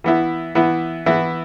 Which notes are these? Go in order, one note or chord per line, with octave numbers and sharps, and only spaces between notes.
E3 B3 E4
E3 B3 E4
E3 B3 E4